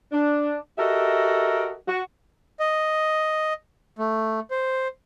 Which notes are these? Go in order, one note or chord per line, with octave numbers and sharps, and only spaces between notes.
D4
F#4 G4 A4 A#4 D#5 E5
F#4
D#5
A3
C5